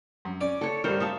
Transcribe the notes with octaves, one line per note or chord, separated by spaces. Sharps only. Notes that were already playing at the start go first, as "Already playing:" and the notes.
F#2
C#4 D5
A4 C#5
G#1 G2 G3 A#4 C5
E5 F5 A5 C#6 D#6